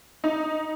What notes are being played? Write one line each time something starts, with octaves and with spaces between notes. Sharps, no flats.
D#4